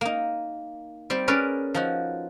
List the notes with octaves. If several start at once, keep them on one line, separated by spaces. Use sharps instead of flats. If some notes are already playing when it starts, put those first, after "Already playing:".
A#3 D#4
G3 C4 G4 C5
C#4 G#4 A#4 B4 C#5 D5
F3 D#4 F#4